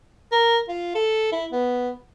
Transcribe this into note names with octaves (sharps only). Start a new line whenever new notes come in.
A#4
F4
A4
E4
B3